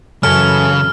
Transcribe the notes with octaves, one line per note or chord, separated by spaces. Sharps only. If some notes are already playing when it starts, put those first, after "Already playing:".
F#2 C#3 E3 C#4 A4 G#5 F6